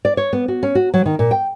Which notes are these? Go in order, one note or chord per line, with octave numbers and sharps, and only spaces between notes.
D5
C#5
B3
F#4
C#4
F#4
F#3
D#3
A#2
G5